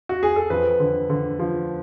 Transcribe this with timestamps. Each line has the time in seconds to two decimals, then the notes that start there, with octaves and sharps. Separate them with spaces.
0.09 F#4
0.23 G#4
0.36 A4
0.50 F2 B4
0.80 D3
1.10 D3
1.39 F3